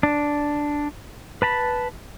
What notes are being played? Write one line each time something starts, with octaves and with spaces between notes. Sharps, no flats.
D4
B4 A5 B5